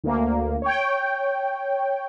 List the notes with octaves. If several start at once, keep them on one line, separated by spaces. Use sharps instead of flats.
D2 A#3
C#5 G5